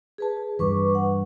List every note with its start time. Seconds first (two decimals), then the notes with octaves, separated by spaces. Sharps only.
0.18 G#4 B4 A5
0.37 G#4
0.59 G2 E3 B4 C#6 D6
0.95 F#5